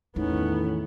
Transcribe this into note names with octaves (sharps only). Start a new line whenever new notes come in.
E2 A2 D#3 B3 C#4 D#4